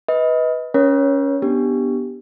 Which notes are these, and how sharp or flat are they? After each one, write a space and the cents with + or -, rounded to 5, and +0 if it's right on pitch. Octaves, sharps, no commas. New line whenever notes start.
B4 +0 D#5 +25
C#4 +10 A#4 +45 C#5 +0
B3 -5 D4 +0 G4 +0